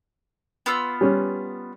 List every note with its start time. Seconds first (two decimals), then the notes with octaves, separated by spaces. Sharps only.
0.66 B3 F4 E6
1.01 G3 C#4